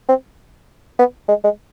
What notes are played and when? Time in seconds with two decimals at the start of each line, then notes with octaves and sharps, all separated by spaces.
0.09 C4
0.99 B3
1.29 G#3
1.44 G#3